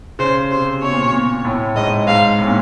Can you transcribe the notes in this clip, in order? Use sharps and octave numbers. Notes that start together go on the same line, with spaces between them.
C#3 C5
C3 C5
B2 C#5
A#2
B2
A#2
A2
G#2 D#5
G#2 F5
A2
A#2